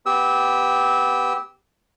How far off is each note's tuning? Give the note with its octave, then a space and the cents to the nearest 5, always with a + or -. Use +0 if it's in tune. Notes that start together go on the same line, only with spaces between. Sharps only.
B3 +0 G4 +0 E6 -25